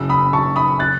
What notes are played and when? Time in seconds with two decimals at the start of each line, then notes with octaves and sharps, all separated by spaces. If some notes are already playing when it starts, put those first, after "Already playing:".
Already playing: F#1 F#3 E6
0.09 B5 D#6
0.33 F#1 A5 C#6
0.56 B5 D#6
0.79 F#6 A6